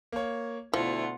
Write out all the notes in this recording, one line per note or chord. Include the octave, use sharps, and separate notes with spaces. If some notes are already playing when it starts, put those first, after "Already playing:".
A#3 C#5
D2 B2 F3 E4 F4 F#5